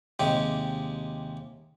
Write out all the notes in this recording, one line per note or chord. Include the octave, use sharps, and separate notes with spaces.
D#2 C3 G#3 G4